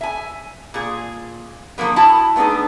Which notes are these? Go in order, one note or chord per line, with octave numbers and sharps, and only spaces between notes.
E5 G#5
A#2 G#4
D3 F3 F#3 A#3 B3
E4 F#4 A5
A3 B3 D4 D#4 G#4